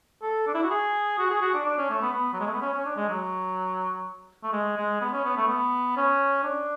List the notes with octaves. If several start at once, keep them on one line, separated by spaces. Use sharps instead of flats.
A4
D4
E4
F#4
G#4
F#4
G#4
F#4
D4
D4
C#4
A3
B3
B3
F#3
G#3
A3
B3
C#4
C#4
D4
G#3
F#3
A3
G#3
G#3
B3
C#4
B3
A3
B3
C#4
D4